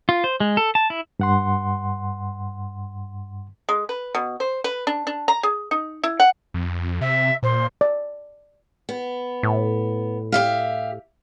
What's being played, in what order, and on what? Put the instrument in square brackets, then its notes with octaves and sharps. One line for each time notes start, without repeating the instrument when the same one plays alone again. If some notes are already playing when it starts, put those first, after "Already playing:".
[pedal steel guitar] F4
C5
G#3
A4
A5
E4
[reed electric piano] G2 F#5 C6
[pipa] G#3
B4
B2
C5
B4
D4
D4
A#5
G#4
D#4
E4
F#5
[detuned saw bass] F2
[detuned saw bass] C3 [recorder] E5
[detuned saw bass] A#2 [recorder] C5
[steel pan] D5
[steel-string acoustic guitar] B3
[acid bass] A2
[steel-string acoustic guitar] G4 E5 F5